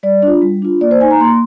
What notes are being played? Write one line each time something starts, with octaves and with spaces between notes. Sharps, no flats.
G3 D5
D4 F4
G3
D4 F4
A#3 D5
C5
D#4 G#5
A#5
A#3 C6